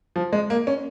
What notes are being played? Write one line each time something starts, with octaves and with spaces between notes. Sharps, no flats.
F3
G#3
A#3
C#4